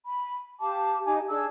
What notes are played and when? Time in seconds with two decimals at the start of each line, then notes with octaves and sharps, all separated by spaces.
0.05 B5
0.60 G4 F5 A5 D6
1.05 D#4 G4 G#5 D6
1.28 D4 G#4 A5 E6